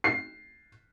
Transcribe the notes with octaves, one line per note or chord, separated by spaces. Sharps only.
C7